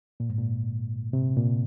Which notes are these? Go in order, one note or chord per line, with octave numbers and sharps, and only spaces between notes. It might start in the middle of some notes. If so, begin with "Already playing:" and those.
A#2
G#2
A#2
C3
A#2